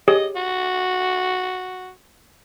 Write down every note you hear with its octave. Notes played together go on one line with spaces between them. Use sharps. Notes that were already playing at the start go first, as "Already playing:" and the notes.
G4 G#4 C#5 D#5
F#4